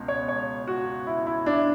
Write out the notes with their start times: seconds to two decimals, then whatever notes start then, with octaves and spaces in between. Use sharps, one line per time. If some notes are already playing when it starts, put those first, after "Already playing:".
Already playing: C#2 B2
0.08 C#5
0.28 C#5
0.68 F#4
1.07 E4
1.27 E4
1.46 D4